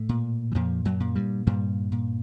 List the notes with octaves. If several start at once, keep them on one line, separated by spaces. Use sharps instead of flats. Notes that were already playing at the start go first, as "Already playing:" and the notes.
Already playing: A2 A3
A#2
E3
F2 A#2 F3
F#2 F#3
A#2
G2 G3
G2 A#2 G3
A#2